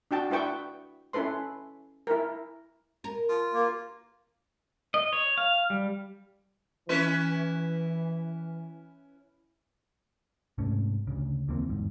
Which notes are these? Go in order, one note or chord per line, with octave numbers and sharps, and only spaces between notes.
D4 F#4 G5 A5
D4 E4 B4 G5 C#6
C#4 E4 A4 B4 C6
E4 A#4
A#4
F4
A#3
D#5
C#5
F5
G3
E3 C#4 E4 B4
G#2 C3 A3 C#4
D2 C#3
D#2 E3 A#3 C4
G1 E2 G#2